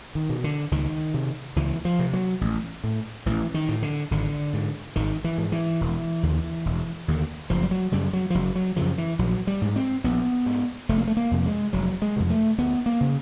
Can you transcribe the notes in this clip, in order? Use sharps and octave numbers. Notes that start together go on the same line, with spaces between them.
D#3
B2
D3
C#2 D#3
C3
C#2 E3
F3
C3
F#3
A1
A2
A1 E3
D#3
A2
D3
G#1 D3
G#2
G#1 D#3
E3
G#2
E3
E1
D#2 D3
E1
D#2 D3
F#1 F3
G3
F#3
F#2 C#3 G3
F#3
F3
F#1 F#3
F#3
F#2 C#3 F3
E3
A#1 F#3
G3
G#2
C4
A#1 B3
G#2
F1 A3
A#3
A3
A#3
F2 C3
G#3
F1 F#3
G#3
F2 C3
A3
D2 B3
A#3
C#3